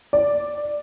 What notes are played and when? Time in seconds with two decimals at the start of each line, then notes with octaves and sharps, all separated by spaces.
0.13 D5